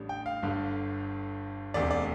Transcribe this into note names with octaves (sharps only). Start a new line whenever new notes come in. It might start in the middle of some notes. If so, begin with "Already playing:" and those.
Already playing: A1 A2 G3 D4
G5
F5
G1 G2 D3
E1 D2 C3 D5
D5